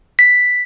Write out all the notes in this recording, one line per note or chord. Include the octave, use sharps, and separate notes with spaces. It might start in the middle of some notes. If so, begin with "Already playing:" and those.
B6